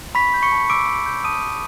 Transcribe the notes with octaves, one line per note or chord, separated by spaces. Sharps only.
B5 C#6 B6
G6
C#6 C#7
A5
D6 E6 D7
C#6
G6
A5 D#6 D#7
E6